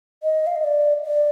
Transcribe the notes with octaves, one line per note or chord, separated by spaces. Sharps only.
D#5
F5
D#5
D5
D5